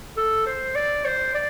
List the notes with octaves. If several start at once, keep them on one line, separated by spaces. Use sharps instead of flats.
A4
C5
D5
C5
D5